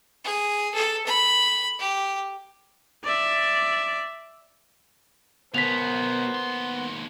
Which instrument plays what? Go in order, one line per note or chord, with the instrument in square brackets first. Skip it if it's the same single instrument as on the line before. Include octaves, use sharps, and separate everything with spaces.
[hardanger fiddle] G#4
A4
B5
G4
[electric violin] D5 E5
[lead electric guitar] B2 C#4 [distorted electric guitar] B3 [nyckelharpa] A#4 C5 [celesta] B6 F7
[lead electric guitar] D#2 C6